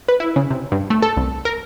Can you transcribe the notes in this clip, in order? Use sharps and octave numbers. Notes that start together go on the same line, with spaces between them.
B4
E4
C#3
C3
G2
A3
A4
C2
A#4